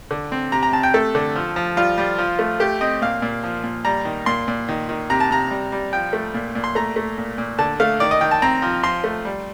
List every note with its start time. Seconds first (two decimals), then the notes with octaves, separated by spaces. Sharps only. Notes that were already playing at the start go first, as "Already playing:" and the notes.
0.11 D3
0.32 C4
0.52 C3 A#5
0.63 A#5
0.73 C3 A5
0.83 G5
0.94 A3 A4
1.15 D3
1.35 F3
1.56 F3
1.77 G3 F4
1.98 G3
2.18 F3
2.39 A3
2.60 A3 G4
2.81 C4 D#5
3.02 A#2 F5
3.22 A#2
3.43 F3
3.63 A#2
3.85 G3 A#5
4.05 D#3
4.26 A#2 C6
4.48 A#2
4.69 D#3
4.89 D#3
5.10 C3 A#5
5.20 A5
5.31 C3 A#5
5.50 G3
5.72 G3
5.92 F3 G5
6.13 A3
6.34 A#2
6.55 A#2
6.64 C6
6.75 A3 A#5
6.96 A3
7.18 A#2
7.38 A#2
7.59 D3 A5
7.80 A3 F5
8.00 D#3 D5
8.11 D#5
8.21 D#3 G5
8.31 A5
8.42 C4 A#5
8.62 F3
8.83 F3 C6
9.04 A3
9.25 G3